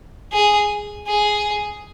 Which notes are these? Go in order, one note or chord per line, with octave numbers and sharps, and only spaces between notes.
G#4
G#4